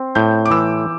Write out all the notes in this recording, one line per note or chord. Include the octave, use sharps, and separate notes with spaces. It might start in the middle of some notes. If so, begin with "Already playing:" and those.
Already playing: C4 C6
A2 G6
D6
E3 E6